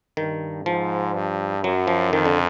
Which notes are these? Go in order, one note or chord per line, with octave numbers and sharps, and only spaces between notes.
G2 D#3
G#2 F3
G2
F#2 F#3
F3
F2 D#3
D3